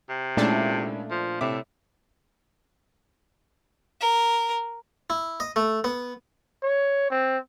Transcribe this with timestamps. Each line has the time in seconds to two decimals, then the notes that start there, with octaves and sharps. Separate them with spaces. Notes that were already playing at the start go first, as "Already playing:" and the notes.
0.09 C3
0.37 A#2 G#3 A3 C#4 D4 E4
1.11 F3
1.41 A2 C3 E5 D6
4.01 A#4
5.10 E4
5.40 D#5
5.56 A3
5.84 B3
6.63 C#5
7.10 C4